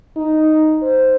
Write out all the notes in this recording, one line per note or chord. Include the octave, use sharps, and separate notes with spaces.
D#4
C5